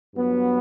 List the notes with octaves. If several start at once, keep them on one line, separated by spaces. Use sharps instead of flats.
G2 F#3 B3